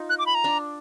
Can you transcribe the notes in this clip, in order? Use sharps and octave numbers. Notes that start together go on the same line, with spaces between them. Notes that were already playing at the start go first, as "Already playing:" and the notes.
Already playing: D#4 F4
F#6
D6
B5
A#5
D4